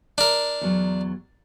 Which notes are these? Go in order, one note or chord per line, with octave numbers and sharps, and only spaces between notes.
D4 A#4
E2 F#3